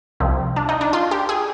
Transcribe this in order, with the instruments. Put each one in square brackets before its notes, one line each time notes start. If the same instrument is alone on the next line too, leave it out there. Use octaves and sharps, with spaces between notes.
[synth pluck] C2 C3 F3 C4
D4
D#4
D4
F4
G4
G#4